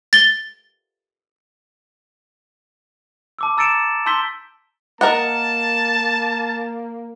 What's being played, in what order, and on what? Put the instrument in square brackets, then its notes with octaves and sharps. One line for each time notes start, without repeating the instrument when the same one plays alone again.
[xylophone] A6 G7
[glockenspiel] A5 D6 E6
A#5 E6 A6 C#7 D7 E7
A5 C6 E6 G6 B6 G7
[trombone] A#3 [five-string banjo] A#4 D#5 F#5 [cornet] A5